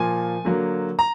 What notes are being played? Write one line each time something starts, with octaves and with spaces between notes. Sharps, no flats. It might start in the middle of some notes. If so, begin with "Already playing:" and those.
Already playing: A#2 F3 A#3 G#5
D3 F#3 A#3
A#5